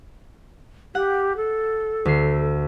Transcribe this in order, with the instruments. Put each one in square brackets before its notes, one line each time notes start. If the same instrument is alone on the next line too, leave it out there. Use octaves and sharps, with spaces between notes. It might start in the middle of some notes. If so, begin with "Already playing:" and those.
[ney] G4 [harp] F#5
[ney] A4
[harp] D2 C7